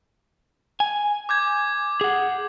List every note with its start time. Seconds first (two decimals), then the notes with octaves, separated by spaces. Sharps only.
0.80 G#5
1.29 D6 G6 G#6
2.01 G#4 F#5